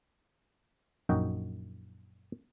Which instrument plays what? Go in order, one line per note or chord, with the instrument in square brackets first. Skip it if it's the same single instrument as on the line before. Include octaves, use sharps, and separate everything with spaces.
[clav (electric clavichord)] A#1 F#2 D#4 F#4 D#5 G5